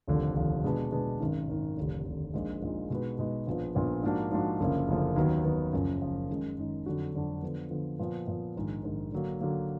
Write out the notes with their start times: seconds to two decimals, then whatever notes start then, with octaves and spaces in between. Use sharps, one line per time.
0.08 F1 D#2 D3 F3
0.36 F1 D#2 D3 F3
0.64 B2 G#3 D4 G#4 B4
0.92 B2 G#3 D4 G#4 B4
1.20 G#1 F#2 D#3
1.49 G#1 F#2 D#3
1.77 F1 D#2 D3
2.05 F1 D#2 D3
2.34 A#1 A#2 G#3 D#4
2.62 A#1 A#2 G#3 D#4
2.90 B2 G#3 D#4 F#4 B4
3.18 B2 G#3 D#4 F#4 B4
3.47 A#1 A#2 F3 B3
3.75 A#1 A#2 F3 B3
4.03 G#2 F3 A#3 D4 F#4
4.32 G#2 F3 A#3 D4 F#4
4.60 F#1 F#2 D3 F3 A#3
4.88 F#1 F#2 D3 F3 A#3
5.16 D#2 D#3 F#3 B3
5.44 D#2 D#3 F#3 B3
5.73 F#1 F#2 F3
6.02 F#1 F#2 F3
6.30 F#2 D#3 G#3 D#4
6.57 F#2 D#3 G#3 D#4
6.86 F2 D3 F#3 D4 F#4
7.14 F2 D3 F#3 D4 F#4
7.42 D3 F3 B3
7.70 D3 F3 B3
7.99 A#2 F3 B3
8.27 A#2 F3 B3
8.56 A#1 G#2 D#3
8.83 A#1 G#2 D#3
9.12 D3 F#3 A#3
9.41 D3 F#3 A#3